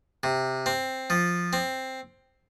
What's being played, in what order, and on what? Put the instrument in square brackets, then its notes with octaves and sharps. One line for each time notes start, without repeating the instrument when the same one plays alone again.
[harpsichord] C3
C4
F3
C4